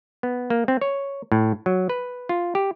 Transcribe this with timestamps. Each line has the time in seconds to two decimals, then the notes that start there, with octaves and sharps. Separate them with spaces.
0.23 B3
0.50 A#3
0.68 C4
0.81 C#5
1.32 A2
1.66 F#3
1.89 B4
2.29 F4
2.55 G4